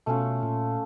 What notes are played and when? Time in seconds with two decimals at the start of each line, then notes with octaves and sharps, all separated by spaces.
0.06 B2 A3 C#4 F4
0.43 A#2